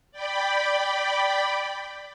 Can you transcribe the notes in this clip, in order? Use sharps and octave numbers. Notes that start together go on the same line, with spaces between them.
D5 G5 B5